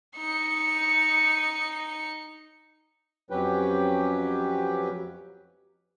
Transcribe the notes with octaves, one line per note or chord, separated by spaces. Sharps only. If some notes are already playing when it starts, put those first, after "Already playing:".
D#4 C#7
F2 F#3 C#4 G4 B4 G5